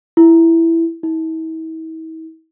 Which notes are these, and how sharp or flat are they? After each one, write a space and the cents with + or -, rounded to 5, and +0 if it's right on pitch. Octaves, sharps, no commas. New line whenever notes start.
E4 +5
E4 -45